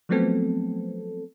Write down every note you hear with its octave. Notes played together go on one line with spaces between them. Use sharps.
F3 F#3 A3 B3 C4 A4